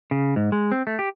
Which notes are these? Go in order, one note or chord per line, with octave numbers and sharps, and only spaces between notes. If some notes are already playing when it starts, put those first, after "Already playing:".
C#3
G#2
G#3
C4
A3
G4